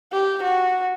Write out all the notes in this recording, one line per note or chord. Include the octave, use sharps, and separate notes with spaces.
G4
F#4